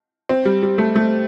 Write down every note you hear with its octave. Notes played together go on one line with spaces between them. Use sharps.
C4
G3
G3
A3
A3